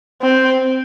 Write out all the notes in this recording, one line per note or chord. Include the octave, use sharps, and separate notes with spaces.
C4